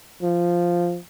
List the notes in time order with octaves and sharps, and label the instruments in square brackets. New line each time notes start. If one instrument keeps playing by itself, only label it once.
[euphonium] F3